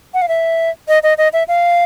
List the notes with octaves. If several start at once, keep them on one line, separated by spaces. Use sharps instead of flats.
F#5
F5
E5
D#5
D#5
D#5
E5
F5